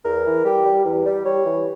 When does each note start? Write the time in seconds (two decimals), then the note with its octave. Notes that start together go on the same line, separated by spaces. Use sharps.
0.04 E2 A#4
0.25 E3
0.45 G3 G4
0.65 G3
0.85 E2
1.06 G3
1.25 G3 C#5
1.45 E3